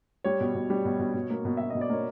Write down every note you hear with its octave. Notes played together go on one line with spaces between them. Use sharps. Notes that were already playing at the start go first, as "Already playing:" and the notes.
G3 C#5
B2
B2
G3
B2
B2
B2
A#3
B2
B2 E5
D#5
B2
D5
A#3 C#5